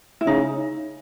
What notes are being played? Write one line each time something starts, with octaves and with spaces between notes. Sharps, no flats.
E4
C#3 D#4